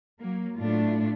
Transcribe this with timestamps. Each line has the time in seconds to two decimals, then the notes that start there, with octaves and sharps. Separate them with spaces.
0.20 F#3 A#3
0.59 A2 A3 D4 F4